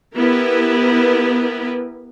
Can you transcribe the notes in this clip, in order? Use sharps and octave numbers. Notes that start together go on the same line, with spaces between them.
B3 E4 G4 A#4 B4